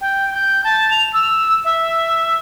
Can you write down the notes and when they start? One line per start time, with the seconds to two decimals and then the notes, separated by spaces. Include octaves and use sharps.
0.01 G5
0.34 G6
0.64 A5
0.91 F7
1.13 E6
1.65 E5